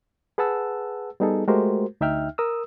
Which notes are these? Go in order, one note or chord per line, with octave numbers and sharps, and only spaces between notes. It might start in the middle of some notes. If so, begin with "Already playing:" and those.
G#4 B4 F#5 A5 E6
G3 B3 D#4 G#4 A4
G#3 A3 F#4 G4 A#4 C5
D2 D#4 E5 G5 F6
A#4 D#6 E6